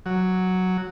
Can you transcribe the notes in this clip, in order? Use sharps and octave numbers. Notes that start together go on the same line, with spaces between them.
F#3